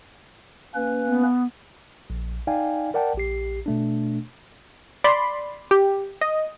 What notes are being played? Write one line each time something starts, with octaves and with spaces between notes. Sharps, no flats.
A#3 C#4 B4
B3
A#1
D#4 D5 F5 G5 G#5
A#4 D5 F#5 G5 A5
A#1 G4 C7
B2 A3 D4
D5 B5 C6
G4
D#5